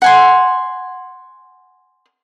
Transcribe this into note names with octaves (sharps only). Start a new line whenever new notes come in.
F#5 G#5 C6